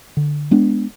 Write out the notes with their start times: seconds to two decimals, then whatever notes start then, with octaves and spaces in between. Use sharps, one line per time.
0.17 D3
0.51 G#3 B3 D4